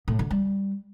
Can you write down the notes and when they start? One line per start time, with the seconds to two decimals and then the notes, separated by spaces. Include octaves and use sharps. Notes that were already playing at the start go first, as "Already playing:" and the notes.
0.08 A2
0.19 D3
0.31 G3